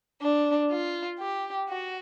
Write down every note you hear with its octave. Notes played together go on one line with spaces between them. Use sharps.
D4
F4
G4
F#4